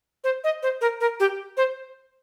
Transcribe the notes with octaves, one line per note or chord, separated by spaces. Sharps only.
C5
D#5
C5
A#4
A#4
G4
C5